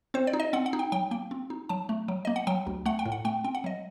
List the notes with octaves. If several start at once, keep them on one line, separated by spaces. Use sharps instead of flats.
C4 C5
D5
D#4
D#5
C4 F#5
F#5
D#4
G5
F#3 G5
A#3 G5
C4
D#4
F#3 A5
A3
F#3
A#3 D#5
F#5
F#3 G5
D2
A3 F#5
G5
A2
F#5
A3 G5
C4 G5
F#5
F#3 D#5